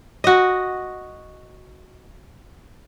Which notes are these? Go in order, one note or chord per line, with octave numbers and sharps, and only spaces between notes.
F#4 D#5